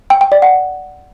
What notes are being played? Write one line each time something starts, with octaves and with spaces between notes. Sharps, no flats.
G5
G5
D5
F#5